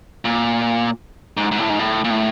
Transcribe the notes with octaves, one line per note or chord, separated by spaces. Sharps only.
A#2
G#2
G#2
A2
G#2
A2
A#2
A2